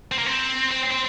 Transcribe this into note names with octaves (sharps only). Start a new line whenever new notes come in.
C4
A#3
C4
C4
C4